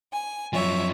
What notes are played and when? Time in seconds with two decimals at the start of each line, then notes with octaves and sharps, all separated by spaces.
0.11 G#5
0.53 F#2 F3 C#5 E5